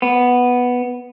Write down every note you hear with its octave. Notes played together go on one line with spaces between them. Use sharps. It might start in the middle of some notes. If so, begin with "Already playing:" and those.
B3